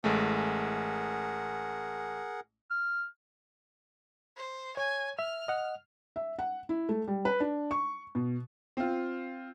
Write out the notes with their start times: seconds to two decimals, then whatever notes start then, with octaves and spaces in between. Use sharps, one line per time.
0.04 A1 G#3 A3 G#4 A#4 F#5
2.71 F6
4.36 C5
4.77 C#5 G#5
5.19 E5 F6
5.48 D#5 F#5
6.16 E5
6.39 F#5
6.69 E4
6.89 A3
7.08 G3
7.25 B4
7.40 D4
7.71 C#6
8.15 B2
8.77 C4 F4